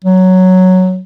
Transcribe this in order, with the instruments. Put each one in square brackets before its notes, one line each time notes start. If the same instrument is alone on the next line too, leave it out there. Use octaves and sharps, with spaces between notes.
[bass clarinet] F#3